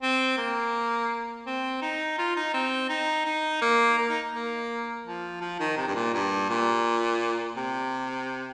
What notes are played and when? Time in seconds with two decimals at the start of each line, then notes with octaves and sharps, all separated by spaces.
0.02 C4
0.37 A#3
1.46 C4
1.82 D#4
2.18 F4
2.36 D#4
2.54 C4
2.89 D#4
3.25 D#4
3.62 A#3
3.98 A#3
4.09 D#4
4.34 A#3
5.06 F3
5.41 F3
5.60 D#3
5.77 C3
5.87 G2
5.95 A#2
6.14 G2
6.49 A#2
7.56 C3